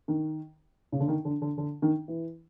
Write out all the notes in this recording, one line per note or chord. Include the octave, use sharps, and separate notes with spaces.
D#3
C#3
D3
D#3
D3
D3
D3
D#3
E3